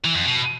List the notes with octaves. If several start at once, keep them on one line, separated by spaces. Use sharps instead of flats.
E3
F2
B2